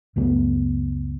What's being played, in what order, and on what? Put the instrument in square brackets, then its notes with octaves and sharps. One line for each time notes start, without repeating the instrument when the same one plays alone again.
[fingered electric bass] C#2 F#2 A3 B3